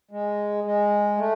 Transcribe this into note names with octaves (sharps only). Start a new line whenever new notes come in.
G#3
G#3
A3